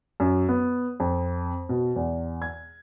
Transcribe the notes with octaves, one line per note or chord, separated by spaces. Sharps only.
F#2
B3
F2
B2
E2
G#6